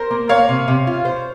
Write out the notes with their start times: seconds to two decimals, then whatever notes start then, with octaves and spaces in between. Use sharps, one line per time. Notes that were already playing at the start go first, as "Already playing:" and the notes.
Already playing: A#4 C5
0.11 A#3
0.29 A#3 C#5 F5
0.49 C3
0.68 C3
0.87 F4
1.05 C5